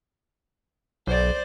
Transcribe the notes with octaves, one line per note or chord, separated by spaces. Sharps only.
B1 C5 D5